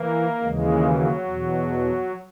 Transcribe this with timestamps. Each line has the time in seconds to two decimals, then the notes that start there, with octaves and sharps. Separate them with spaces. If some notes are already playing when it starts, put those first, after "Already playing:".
Already playing: E3 A#3
0.41 D#2 C#3 E3 G#3
0.82 F#3
1.23 E2 B2